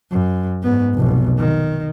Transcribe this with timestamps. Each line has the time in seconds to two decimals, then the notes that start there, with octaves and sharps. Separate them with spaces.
0.11 F#2
0.63 G#2 B3
0.95 F1 B1
1.38 D#3